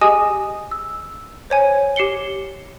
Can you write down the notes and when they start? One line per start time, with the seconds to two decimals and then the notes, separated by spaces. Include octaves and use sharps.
0.01 G4 G#4 D#5 G#5 D#6
0.71 E6
1.50 C5 C#5 G#5
1.96 G4 C7 C#7 G7